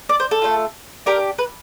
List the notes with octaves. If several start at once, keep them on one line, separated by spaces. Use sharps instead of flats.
D5
C5
A4
A3 C#4 F4
D4 G4 A#4
B4